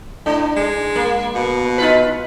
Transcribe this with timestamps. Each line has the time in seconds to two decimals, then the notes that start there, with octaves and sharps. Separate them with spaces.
0.26 A2 D4
0.56 G#3
0.96 A#3
1.35 B2
1.78 D#4 F4 B4